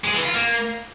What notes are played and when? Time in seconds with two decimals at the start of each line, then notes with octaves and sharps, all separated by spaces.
0.04 G#3
0.14 E3
0.24 F4
0.34 A#3